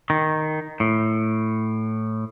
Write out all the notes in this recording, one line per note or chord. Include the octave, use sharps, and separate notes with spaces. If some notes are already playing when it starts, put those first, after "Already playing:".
D#3
A2